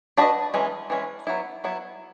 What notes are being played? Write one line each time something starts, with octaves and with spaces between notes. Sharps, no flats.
D4 F#4 B4 D#5
E3 G#3 C#4
E3 G#3 C#4
F#3 B3 E4
F#3 B3 E4